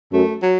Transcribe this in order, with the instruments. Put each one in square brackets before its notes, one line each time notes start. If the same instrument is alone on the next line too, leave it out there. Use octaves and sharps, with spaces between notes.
[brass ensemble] F#2 [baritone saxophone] A3
[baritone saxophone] F#3